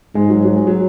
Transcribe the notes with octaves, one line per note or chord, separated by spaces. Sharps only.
G#2 G#3
F#3
F#3
G#3
F#3